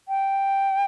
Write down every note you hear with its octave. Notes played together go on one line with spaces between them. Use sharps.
G5